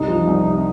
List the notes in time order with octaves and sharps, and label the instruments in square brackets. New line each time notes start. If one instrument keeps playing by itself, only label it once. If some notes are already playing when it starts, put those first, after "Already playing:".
Already playing: [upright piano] C2 G3 [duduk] D#4
[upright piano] F3
C2
C3